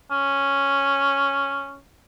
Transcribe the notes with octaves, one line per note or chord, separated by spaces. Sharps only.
C#4